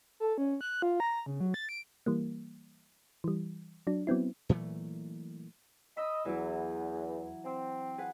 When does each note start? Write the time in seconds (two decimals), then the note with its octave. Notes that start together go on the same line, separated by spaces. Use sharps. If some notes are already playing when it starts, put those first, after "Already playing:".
0.20 A4
0.38 C#4
0.61 F#6
0.82 F4
1.00 A#5
1.26 C#3
1.41 F#3
1.54 A6
1.69 D7
2.06 E3 G3 A#3
3.24 E3 G3
3.87 F#3 D4
4.07 F#3 B3 C4 E4
4.49 A#2 E3 F#3 A3
5.97 D#5 B5 E6
6.25 E2 E3 F#3 E4
7.45 C4
7.98 G#4 B4 F#5